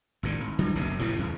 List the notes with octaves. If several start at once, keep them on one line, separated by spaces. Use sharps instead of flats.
G#1 A2 D3
G#1
D3 F#3 G3
F#1 B1 F#2 C3
A2 C3 E3 F3
E2 C#3